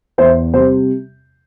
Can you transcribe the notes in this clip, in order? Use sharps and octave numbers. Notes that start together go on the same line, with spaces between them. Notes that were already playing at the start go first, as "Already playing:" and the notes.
E2 C5 E5
C3 G3 C5